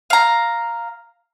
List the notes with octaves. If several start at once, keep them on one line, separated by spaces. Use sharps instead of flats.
F5 A#5